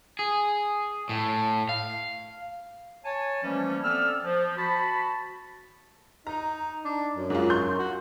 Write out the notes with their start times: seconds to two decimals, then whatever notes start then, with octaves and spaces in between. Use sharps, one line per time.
0.19 G#4
1.09 A2
1.69 F5
3.05 C#5 G#5 A5
3.43 E3 F3 G3 A3 A#3 C#4
3.83 B3 C4 A4 D5 E6 F6
4.24 F3
4.57 F#4 A5 B5
6.27 D#4 A#5
6.85 D4
7.16 F#2
7.30 G#2 F4
7.50 C6 C#6 G6
7.79 F#4